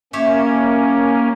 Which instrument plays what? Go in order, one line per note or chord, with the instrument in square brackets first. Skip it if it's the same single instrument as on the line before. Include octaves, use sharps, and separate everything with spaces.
[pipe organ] A#3 C#4 [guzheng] G4 C#5 E5